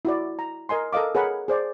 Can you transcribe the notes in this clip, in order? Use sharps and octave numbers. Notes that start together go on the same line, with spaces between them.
E4 F#4 D5
A#5
A#4 D#5 G#5 C6
A4 A#4 D#5 F5 D6
G#4 A#4 B4 C#5 F#5 B5
G#4 C5 D5